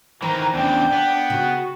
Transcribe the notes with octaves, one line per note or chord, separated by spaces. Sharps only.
D#3 E3 C4 A#5
E2 C#3 D4 G5
B3
C#3 F#4